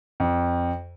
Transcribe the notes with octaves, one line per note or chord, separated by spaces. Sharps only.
F2